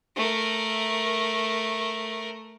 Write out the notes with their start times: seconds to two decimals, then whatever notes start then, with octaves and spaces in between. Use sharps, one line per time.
0.16 A3 A#4